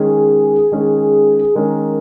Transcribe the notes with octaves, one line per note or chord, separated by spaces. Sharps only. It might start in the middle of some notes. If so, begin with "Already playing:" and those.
Already playing: D#3 G#3 C#4 G#4
D#3 G#3 C#4
D#3 G#3 C#4 A#4